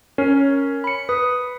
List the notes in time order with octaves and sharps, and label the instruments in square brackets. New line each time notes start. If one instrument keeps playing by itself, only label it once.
[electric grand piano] C#4 [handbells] A#4
[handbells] B5 C#7
[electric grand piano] B4 [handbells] D#6